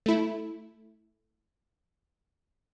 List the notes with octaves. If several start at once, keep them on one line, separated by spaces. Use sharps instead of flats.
A3 E4